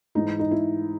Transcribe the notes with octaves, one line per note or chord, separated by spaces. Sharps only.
G#2 E3 D#4
D#4
E4